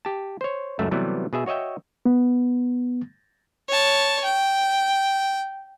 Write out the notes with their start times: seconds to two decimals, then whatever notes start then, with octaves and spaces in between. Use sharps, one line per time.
0.05 G4 A5
0.41 C5 C#5
0.79 C#2 F#2 A3 E5
0.91 C3 E3 F#3 G3 A3 B3
1.33 B2 G#4 E5
1.46 F#4 C#5 D#5 E5 G5
2.06 B3
3.69 C#5 A5
4.24 G5